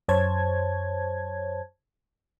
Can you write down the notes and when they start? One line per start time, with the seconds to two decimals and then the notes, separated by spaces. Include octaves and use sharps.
0.08 F#2 C5 C#5 A5 G#6